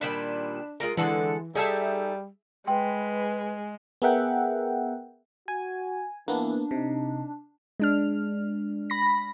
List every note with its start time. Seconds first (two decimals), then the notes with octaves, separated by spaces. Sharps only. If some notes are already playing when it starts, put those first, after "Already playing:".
0.01 A#2 D#3 G3 D4 B5 E7
0.80 G#3 F4 A#4
0.97 D3 E3 G#3 A4 F#5
1.55 G3 D#4 G#4 A4 E5 A5
2.67 G#3 B4 G5 C6
4.02 B3 G#4 A#4 E5 F#5 G5
5.48 F#4 G#5
6.28 E3 A#3 B3 D4
6.71 C3 D#4
7.80 G#3 D4 F6
8.90 B5 A#6